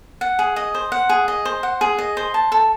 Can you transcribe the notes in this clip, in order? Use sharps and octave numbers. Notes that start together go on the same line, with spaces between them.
F#5
G#4
D#5
C5
F#5
G#4
D#5
C5
F#5
G#4
D#5
C5
A5
A4